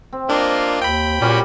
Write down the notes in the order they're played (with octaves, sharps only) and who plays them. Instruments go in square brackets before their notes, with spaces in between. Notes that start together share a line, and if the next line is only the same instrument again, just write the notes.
[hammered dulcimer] C4
[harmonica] A#3 F4 D#5 [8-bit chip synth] D4
[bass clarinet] D#2 [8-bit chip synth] G5 B5
[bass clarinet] A#2 [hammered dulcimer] G3 D5 [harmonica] A#3 C#4 F#4